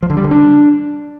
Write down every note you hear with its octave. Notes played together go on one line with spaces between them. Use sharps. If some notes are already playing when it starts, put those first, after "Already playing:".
F3
D3
G3
D3
D4